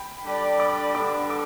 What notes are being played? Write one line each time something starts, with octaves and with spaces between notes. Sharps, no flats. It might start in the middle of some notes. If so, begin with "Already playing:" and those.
Already playing: G5 B5
G3 D4 A4 D5
B5 D6
D3 G3 B3 D4 A4 B5 D6
D6